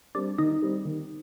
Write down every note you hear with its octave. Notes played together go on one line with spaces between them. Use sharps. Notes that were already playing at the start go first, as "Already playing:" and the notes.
G3 C4 D4
D#3 D#4
G3 C4
D#3